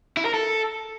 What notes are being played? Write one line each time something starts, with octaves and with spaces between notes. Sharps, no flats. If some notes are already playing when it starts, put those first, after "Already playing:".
E4
A#4
A4